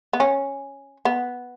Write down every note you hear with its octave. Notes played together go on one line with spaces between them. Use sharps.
B3
C#4
B3